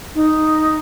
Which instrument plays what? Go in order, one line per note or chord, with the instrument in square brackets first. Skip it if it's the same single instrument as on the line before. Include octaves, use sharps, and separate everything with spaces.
[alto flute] D#4